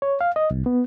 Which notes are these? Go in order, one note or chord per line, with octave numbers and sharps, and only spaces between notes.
C#5
F5
D#5
C2
B3